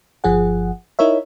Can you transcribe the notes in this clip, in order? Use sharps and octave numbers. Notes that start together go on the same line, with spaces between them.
G1 F3 G#4 F#5
D#4 E4 A#4 C#5 E5